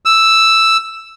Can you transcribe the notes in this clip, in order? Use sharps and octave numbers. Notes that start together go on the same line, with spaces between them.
E6